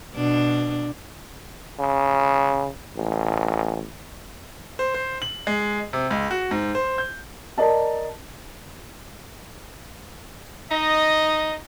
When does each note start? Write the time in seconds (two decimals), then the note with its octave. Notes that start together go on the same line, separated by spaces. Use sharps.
0.14 B2 D4
1.79 C#3
2.96 A1
4.79 C5
4.94 C5
5.22 F#7
5.47 G#3
5.93 C3
6.11 C#2
6.31 F#4
6.51 G#2
6.75 C5
6.98 G6
7.58 A#4 D5 D#5 A5
10.71 D#4 D#5